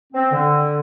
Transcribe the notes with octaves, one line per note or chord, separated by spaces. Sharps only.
C4
D3